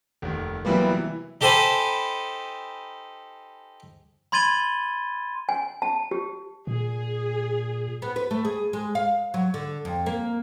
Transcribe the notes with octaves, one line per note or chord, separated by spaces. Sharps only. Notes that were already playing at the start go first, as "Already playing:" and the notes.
F1 D#2
C3 E3 F#3 G3 A#3 B3
E3
D#4 G4 A4 C5 G#5 B5
B5 C6 G#6 A6 D#7 G7
G#5
A5
G4
A#2 G#4
B3
B4
A3
G#4
G#3
F5
F#3
D3
F2
A#3